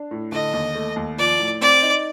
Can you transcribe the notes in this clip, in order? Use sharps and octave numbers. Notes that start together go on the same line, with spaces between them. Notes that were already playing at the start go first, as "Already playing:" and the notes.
Already playing: D4
A2
D3 D#5
D#2
A3
D#2
F3 D5
A2
C4 D5
D#4